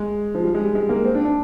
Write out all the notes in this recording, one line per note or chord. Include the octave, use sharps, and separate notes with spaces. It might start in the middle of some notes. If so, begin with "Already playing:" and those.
Already playing: G#3
F3
G3
G#3
G3
G#3
A#3
C4
D4
D4